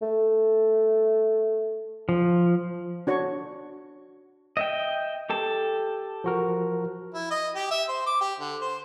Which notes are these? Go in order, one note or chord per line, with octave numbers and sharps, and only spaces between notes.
A3
F3
D4 F#4 C#5 C#6
D#5 E5 G5
G4 A4 A5
F3 F#4 A#4
E4
D#5
G4
E5
C5
D6
G4
D3
C5